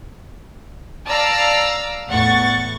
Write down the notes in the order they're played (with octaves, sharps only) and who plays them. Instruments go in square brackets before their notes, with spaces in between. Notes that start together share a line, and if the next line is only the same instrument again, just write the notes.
[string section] D5 F5 A5 A#5 E6
E2 A2 F#5 C#6 A6